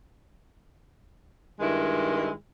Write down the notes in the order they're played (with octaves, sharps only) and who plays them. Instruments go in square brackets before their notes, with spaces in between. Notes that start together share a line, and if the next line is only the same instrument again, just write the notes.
[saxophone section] G2 D#3 G#3 E4